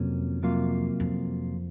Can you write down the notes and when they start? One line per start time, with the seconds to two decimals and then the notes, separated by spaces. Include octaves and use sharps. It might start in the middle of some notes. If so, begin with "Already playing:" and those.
Already playing: F2 C3 F#3 A#3 C#4
0.43 C3 F#3 A#3 F4
1.00 F2